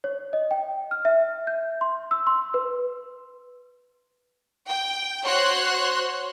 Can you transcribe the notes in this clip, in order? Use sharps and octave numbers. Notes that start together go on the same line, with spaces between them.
C#5
D#5
G5
F6
E5
G6
C6
E6
C6
B4
G5
F#4 C5 C#5 C6 F#6